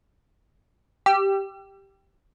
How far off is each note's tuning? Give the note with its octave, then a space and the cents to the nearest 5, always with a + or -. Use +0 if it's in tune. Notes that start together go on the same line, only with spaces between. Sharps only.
G4 +0 E6 +45